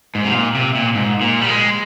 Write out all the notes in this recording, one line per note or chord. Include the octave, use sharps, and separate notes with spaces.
G#2
C3
A#2
C3
A#2
G#2
A#2
G3
G#3